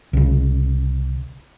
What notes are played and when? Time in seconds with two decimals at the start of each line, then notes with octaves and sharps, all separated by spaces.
0.13 C2 C#3